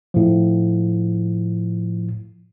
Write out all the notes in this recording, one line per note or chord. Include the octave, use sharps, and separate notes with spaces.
A2 F3